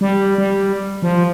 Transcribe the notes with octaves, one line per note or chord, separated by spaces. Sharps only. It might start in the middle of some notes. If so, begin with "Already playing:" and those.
G3
G3
F3